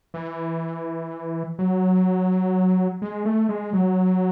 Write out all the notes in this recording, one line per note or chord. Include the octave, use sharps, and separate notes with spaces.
E3
F#3
G#3
A3
G#3
F#3